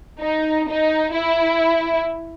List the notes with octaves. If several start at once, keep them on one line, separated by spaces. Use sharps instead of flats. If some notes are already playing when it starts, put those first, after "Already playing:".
D#4
D#4
E4